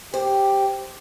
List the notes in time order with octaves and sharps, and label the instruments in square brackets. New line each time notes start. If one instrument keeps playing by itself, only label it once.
[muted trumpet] G4 [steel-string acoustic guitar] C5